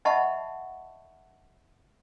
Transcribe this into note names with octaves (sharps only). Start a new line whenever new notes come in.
D#5 E5 F#5 A5 B5 C#6